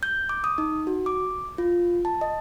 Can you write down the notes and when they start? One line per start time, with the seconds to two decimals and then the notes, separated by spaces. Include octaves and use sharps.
0.03 G6
0.29 D6
0.44 D#6
0.58 D#4
0.87 F#4
1.06 D6
1.58 F4
2.05 A5
2.21 D#5